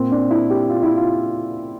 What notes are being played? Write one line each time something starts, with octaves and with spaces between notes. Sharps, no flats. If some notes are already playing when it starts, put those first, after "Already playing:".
Already playing: A#2 C4
D4
E4
G4
F4
E4
F4